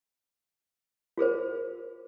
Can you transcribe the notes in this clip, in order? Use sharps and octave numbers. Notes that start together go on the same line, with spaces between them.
F4 G#4 A#4 C5